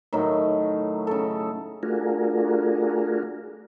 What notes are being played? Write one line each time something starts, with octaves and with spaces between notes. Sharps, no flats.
A2 D#3 F#3
C#3 A4
A3 D4 F4 F#4 G#4 A#4